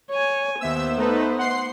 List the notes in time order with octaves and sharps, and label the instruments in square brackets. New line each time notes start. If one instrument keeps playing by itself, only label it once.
[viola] C#5 G#5
[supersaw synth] D#2 E5 E6 [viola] B3 C5
[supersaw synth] A3 D#4 B4
F#5 C6 C7